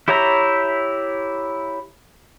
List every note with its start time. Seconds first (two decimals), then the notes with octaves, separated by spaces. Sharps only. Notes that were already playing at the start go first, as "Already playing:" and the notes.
0.08 E4 G4 C#5 E5 A#5